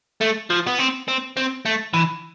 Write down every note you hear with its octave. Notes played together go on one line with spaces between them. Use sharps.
A3
F3
B3
C4
C4
C4
A3
E3